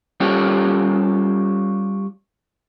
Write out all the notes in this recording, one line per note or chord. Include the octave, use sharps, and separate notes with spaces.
G3 C#4 F4 G4 A4 C#5